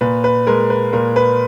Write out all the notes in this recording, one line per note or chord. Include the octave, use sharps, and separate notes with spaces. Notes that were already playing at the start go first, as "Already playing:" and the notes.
A#2 B4
B4
G#3 A#4
B4
A#2 A#4
B4